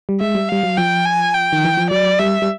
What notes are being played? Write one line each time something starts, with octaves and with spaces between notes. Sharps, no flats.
G3
G#3 E5
G3
G3 F5
F#3
F3 G5
G#5
G5
D#3
E3
F3
F#3 D5
G3 E5
G3